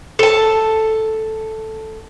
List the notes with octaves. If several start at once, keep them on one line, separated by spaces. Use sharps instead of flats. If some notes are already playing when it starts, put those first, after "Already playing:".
A4 A5